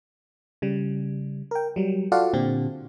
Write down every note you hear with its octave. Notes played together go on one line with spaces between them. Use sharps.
C#3 G3
A#4 G5
F#3 G3
F4 F#4 A4 D5 F5 F#5
A#2 D3 C4 G4